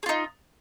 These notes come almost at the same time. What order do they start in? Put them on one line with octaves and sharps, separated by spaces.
G#4 F4 D#4